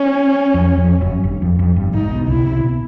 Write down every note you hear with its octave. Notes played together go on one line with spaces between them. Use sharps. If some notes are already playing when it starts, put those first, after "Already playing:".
Already playing: C#4
F2
F2
F#1 F#2
G1 G2
F2
F2
G1 G2
G#1 G#2 D#4
B1 B2
C2 C3 E4
C2 C3
C3
B2